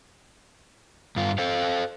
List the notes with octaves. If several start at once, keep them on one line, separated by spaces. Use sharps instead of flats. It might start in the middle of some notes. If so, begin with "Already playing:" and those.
G2 F4
A4 C5 F5